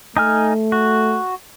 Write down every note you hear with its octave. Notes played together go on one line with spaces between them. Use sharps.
A3 D#4 G#5 F6
F#4